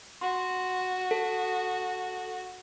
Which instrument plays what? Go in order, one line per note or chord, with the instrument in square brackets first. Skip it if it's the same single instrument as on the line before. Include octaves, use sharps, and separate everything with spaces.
[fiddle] F#4 [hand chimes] C6
[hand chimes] A4